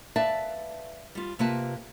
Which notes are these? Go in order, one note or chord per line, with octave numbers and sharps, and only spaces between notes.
B4 D5 E5 F5 A5
G3 F4
C3 A#3 F4 B4 A5